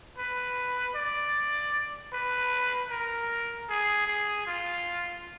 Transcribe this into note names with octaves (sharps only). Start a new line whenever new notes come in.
B4
D5
B4
A#4
G#4
G#4
F4